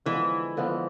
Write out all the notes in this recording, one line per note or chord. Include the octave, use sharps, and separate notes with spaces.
D3 E3 F3 G#3 B3
D3 F3 G#3 B3